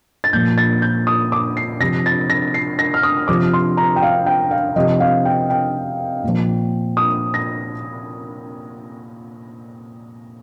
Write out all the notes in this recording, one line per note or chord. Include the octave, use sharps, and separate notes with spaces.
A6
A#2 F3 G6
A6
G6
D#6
D6
C7
C3 F3 A#6
A6
A#6
C7
A#6
F6
D#6
C3 F3 D6
C6
A#5
G5
F5
G5
F5
C3 F3 D#5
F5
G5
G5
A#2 F3
D#6
A#6